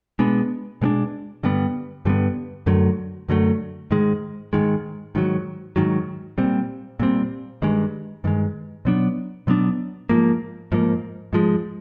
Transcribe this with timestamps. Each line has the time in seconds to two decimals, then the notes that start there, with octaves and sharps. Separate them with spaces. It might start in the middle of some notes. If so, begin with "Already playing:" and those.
0.19 B2 G#3 B3 D4
0.81 B2 G#3 B3 D4
1.43 G2 D3 G3 B3
2.05 G2 D3 G3 B3
2.66 F#2 D3 F#3 A3
3.29 F#2 D3 F#3 A3
3.91 G#2 D#3 G#3
4.53 G#2 D#3 G#3
5.15 G#2 D#3 F#3
5.76 G#2 D#3 F#3
6.38 A#2 G3 C4
7.00 A#2 G3 C4
7.62 G2 D#3 G#3
8.24 G2 D#3 G#3
8.85 B2 F#3 B3 D4
9.47 B2 F#3 B3 D4
10.09 G#2 F3 A#3
10.72 G#2 F3 A#3
11.33 G#2 F3 G#3